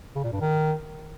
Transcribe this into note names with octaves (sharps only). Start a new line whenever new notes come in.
C#3
A#2
G2
D#3